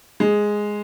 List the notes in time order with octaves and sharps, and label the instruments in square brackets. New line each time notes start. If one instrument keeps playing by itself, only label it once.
[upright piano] G#3